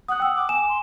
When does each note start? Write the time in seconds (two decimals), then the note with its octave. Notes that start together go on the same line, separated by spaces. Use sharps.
0.08 F#5 D#6 F#6
0.20 G5 D#6 E6
0.35 D6
0.49 G#5 E7
0.68 C6